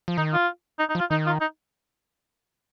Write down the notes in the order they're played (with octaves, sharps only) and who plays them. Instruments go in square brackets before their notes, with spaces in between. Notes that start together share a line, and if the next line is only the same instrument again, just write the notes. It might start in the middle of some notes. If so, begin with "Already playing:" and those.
[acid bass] F3
[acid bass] D#3 [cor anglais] D#4
[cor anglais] F4
D#4
D#4
[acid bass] F3
[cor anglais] F4
[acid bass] D#3 [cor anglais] D#4
[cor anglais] F4
D#4